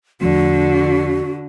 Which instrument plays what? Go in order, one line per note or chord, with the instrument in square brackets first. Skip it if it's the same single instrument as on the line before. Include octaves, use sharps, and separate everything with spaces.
[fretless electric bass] E2 F3 A3 [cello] D3 [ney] F#4